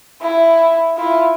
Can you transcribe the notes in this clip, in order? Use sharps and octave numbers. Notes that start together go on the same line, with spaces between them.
E4
E4 F4